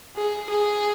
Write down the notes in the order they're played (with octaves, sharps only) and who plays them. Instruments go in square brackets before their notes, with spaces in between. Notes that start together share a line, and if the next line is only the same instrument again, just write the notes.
[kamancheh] G#4
G#4